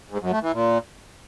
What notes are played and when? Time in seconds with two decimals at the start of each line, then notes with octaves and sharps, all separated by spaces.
0.11 G#2
0.21 F#2
0.32 A3
0.42 E3
0.53 A#2